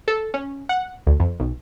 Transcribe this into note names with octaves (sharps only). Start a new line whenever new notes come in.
A4
C#4
F#5
D2
F2
B1